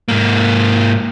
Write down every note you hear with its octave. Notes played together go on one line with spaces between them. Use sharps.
G#2 A#3